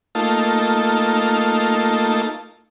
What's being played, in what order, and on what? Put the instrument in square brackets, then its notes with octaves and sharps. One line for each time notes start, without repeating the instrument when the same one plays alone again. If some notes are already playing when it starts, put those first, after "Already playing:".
[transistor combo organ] A3 A#3 D#4 F4 A5